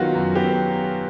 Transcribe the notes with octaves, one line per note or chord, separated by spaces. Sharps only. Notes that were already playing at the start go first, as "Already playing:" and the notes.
Already playing: D#3 F#3 B3 F4 F#4
F#2
B3 G4